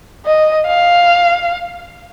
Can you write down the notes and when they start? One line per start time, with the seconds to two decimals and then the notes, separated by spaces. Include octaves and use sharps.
0.26 D#5
0.67 F5